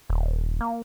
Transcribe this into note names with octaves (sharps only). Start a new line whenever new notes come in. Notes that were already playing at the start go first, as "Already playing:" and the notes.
D#1
A#3